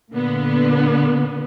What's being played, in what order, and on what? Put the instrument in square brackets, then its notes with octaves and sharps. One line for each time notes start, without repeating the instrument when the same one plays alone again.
[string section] A#2 D3 B3